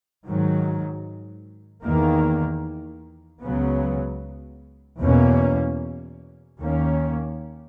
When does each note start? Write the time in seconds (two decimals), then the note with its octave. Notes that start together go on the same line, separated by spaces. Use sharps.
0.25 G#2 D#3 F#3
1.83 E2 D#3 A#3
3.41 C#2 C#3 F#3 B3
4.99 E2 B2 A#3 C#4
6.58 D#2 D#3 A#3 C#4